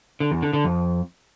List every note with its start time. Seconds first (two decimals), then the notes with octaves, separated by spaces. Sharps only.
0.20 D3
0.31 E2
0.42 D3
0.53 D3
0.64 F2